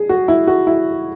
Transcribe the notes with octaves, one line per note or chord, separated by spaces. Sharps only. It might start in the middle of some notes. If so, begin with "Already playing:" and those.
Already playing: G#4
F#4
E4
F#4
E4